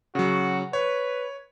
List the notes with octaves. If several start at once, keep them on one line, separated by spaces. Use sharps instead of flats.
C#3 F#3 F#4
B4 C#5